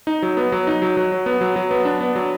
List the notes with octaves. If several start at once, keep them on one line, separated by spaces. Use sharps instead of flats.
D#4
F#3
B3
F#3
D#4
F#3
F#3
F#3
B3
F#3
F#3
B3
D4
B3
F#3